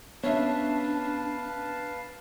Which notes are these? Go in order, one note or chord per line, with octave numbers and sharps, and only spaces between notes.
B3 C#4 D4 B4 C#5 E5 F5 A5